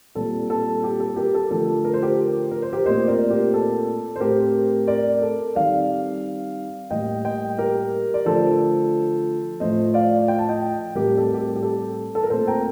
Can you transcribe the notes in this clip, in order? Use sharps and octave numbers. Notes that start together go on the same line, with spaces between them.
A#2 G3 C4 A4
A4
G4
A4
G4 A#4
A4
D3 F3 A3 A4
A#4
C5
G4 A#4
A#4
C5
G4 A#4
A#2 A3 C4 C5 D#5
A#4 D5
G4 A#4
A4
C5
A2 A3 C4 G4 A#4
A#4 D5
A4
D#3 G3 C4 D5 F5
A2 G3 A#3 D#5 G5
D#5 G5
G4 A#4
D5
D3 F3 A3 A4 C5
A2 F3 A3 C5 D#5
D5 F5
G5
A5
D#5 G5
A2 G3 C4 G4 A#4
A4
G4
A4
G4
A4
A4
A#4
A#2 A3 C4 A4 C5
G5 A#5